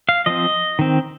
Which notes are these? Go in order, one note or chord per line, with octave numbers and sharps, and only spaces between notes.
F5
F3 C4 D#5
D#3 C4